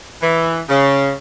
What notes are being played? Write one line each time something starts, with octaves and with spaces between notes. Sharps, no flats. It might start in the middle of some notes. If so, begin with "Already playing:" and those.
E3
C#3